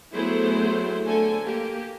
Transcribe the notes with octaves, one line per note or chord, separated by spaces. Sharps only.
F#3 A3 B3 E4 G#4 C5
D3 A3 A4 G#5
A#3 G4